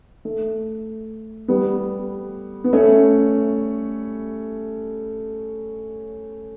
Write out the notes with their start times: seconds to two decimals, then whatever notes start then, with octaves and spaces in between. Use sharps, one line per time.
0.25 A3
1.48 G3 B3
2.64 B3
2.73 A3 C#4